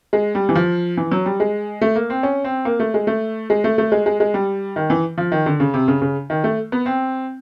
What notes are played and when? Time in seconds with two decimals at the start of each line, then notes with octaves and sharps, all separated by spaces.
0.13 G#3
0.35 G3
0.49 E3
0.55 F3
0.97 E3
1.12 F#3
1.26 G3
1.40 G#3
1.81 A3
1.96 A#3
2.10 C4
2.23 C#4
2.44 C4
2.65 A#3
2.80 A3
2.94 G#3
3.07 A3
3.50 G#3
3.64 A3
3.78 A3
3.92 G#3
4.06 G#3
4.20 G#3
4.34 G3
4.76 D#3
4.90 E3
5.18 F3
5.32 D#3
5.46 D3
5.60 C#3
5.74 C3
5.88 C#3
6.02 C#3
6.30 D#3
6.44 A3
6.72 B3
6.86 C4